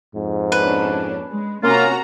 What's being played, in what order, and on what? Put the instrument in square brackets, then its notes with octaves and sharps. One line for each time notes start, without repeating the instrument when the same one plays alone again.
[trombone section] F2 G#2
[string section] A#3 C#4 D4 [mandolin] B4
[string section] G#3
[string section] C3 F#4 A#5 [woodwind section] A#3 F4 [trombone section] C#4